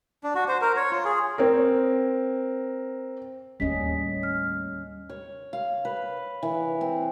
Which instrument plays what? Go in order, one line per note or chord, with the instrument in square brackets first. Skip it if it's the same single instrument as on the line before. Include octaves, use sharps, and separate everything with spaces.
[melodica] D4
F#4
C5
A#4
C#5
F4
G#4
[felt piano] C4 A#4
[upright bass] D#2 A2 [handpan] G3 C#4 D#5 [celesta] B6
[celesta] F6
[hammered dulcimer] C#5
F5
B4
E3
C4